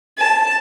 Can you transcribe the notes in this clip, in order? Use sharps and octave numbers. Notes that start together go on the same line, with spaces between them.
A5